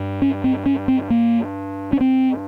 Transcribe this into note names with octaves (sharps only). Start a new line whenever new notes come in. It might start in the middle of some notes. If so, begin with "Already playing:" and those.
Already playing: G2
C#4
C4
C#4
C4
A#3
C#4
C4